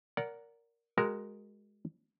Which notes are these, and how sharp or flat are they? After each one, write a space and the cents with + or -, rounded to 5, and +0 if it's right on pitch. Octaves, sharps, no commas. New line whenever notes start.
A#4 +0 D5 -30 F#5 +0
G#3 +0 F#4 +25 A#4 +0